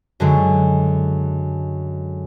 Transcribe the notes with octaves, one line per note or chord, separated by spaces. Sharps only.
F#2 D3 F#3 G#3